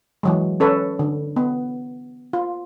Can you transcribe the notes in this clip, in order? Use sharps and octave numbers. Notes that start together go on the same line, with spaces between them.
E3 F#3 G#3
C#4 A4 B4 C#5
D3
B3
F4